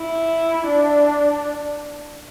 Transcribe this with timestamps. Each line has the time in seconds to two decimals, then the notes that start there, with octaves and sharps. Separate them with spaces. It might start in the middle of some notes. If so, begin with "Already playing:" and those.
Already playing: E4
0.68 D4